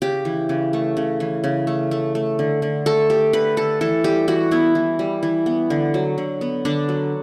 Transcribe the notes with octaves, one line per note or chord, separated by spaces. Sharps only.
C#3 G4
E3
C#3
A3
C#3
E3
C#3
A3
A3
A3
D3
D3
A3 A4
A3 G4
D3 B4
D3 A4
E3 A4
G3 G4
E3 F#4
B3 E4
E3
G3
E3
B3
D3
F#3
D3
B3
D3 D4
F#3